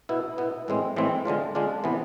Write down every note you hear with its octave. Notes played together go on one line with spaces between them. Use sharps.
B2 B3 E4
B2 B3 E4
A2 E3 G#3 C4
A2 E3 G#3 C4
D3 G#3 D4 F4
D3 G#3 D4 F4
C3 E3 B3